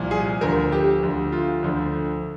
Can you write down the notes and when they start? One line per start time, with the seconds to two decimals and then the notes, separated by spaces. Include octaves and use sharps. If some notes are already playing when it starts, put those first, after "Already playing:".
Already playing: C2 A#2 F3
0.11 G#4
0.41 D2 D3 F3 A#4
0.72 G4
1.03 D2 D3 F3
1.32 F4
1.62 D2 D3 F3